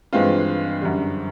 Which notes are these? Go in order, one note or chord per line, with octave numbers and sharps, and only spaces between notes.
G2 E3 G#3 C4 F4
F#2 D3 G3